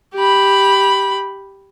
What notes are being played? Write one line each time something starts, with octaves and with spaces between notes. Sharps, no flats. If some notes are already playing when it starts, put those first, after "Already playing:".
G4 B5